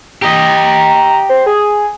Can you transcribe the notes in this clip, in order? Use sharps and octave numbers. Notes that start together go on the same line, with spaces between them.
G4 D#5 A#5
C5
G#4